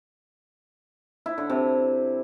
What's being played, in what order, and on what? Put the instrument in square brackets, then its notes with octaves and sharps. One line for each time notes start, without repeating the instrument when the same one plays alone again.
[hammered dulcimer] E4
D3
C3